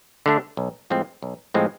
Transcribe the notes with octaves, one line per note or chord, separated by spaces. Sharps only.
D3 A3 D4
B1
A2 F3 G#3 C4
B1
A2 F3 G#3 C4